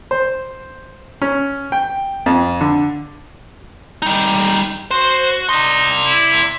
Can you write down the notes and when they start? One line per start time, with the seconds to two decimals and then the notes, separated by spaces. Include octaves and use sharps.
0.11 C5
1.22 C#4
1.72 G5
2.26 F2
2.61 D3
4.02 G3 D#4
4.91 F#4 C5
5.49 D#4 D5 C6
6.06 E4